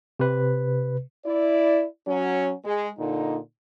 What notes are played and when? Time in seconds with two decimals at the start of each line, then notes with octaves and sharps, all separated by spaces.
0.19 C3 B4
1.25 E4 D5
2.07 F#3 C#4
2.65 G#3
2.98 A#2 D3 D#4